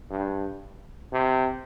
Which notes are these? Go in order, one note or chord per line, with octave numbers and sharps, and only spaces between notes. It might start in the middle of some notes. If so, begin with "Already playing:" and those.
G2
C3